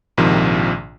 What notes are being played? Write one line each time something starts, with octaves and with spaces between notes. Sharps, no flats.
A#1 G#2 C3 D#3 F3